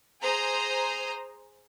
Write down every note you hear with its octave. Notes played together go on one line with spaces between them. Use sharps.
G#4 C5 A#5 D#6